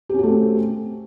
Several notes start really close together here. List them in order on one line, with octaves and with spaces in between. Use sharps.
G4 C#4 F#4 A3 C4